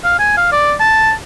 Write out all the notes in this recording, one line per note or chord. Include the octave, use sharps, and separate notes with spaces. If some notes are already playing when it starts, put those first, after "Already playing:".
F5
G#5
F5
D5
A5